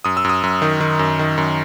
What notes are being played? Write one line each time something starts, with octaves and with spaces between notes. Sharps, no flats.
F#2 D#6
E6
F#2 D#6
F#2
D#3
D#3
F#2
D#3
F#2